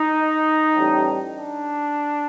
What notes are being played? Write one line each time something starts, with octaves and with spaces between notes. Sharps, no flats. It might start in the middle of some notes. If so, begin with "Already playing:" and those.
Already playing: D#4
A1 A2 G3
D4